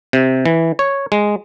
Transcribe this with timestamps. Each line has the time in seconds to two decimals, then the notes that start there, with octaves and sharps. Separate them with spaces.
0.13 C3
0.46 E3
0.79 C#5
1.12 G#3